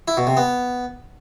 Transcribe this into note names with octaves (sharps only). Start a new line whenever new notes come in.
E4
B2
C3
B3